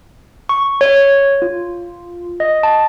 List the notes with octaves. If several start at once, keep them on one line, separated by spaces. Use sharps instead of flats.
C#6
C#5
F4
D#5
A5